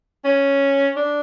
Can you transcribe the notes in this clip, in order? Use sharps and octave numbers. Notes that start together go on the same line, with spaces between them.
C#4
D4